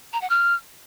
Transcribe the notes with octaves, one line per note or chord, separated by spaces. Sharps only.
A#5
F#5
F6